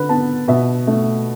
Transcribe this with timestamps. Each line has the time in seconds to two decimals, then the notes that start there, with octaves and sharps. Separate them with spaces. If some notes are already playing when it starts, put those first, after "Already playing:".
Already playing: D3 B4
0.09 B3 A5
0.48 B2 E5
0.87 A3